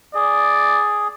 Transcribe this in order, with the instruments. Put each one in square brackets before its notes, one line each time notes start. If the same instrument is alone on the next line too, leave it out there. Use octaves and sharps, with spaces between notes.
[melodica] G#4 [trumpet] D5